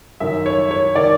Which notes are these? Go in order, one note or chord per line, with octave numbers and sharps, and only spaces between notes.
F#2 D#3 E5
C#5
C#5
D#3 D5